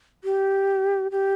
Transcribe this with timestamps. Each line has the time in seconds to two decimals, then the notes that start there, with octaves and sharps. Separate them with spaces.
0.24 G4
1.11 G4